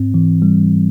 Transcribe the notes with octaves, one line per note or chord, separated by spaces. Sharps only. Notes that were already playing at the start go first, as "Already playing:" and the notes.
Already playing: G#2 C4
E3
G3